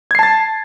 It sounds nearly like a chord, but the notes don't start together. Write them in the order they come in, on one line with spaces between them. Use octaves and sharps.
G#6 C7 A5 A6